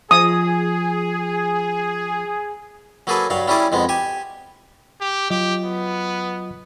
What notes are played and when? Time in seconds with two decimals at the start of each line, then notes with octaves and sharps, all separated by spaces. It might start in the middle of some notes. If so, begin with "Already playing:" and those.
0.11 F3 G#4 D#6
3.07 F#3 A#3 G#4 A4 B4
3.30 G2 F#3 F5
3.48 G3 C#4 E4 G#4 D5
3.72 F2 G#3 B3
3.89 G4 G#5
5.01 G4
5.30 F#3 F4 G4 D#5
5.65 B3